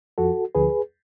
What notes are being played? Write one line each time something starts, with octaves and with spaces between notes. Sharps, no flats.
F2 F3 F#4 A4
D2 D3 F3 G#4 B4